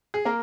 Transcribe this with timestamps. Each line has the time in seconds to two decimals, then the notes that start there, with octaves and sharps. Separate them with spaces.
0.14 G#4
0.25 A#3 A#4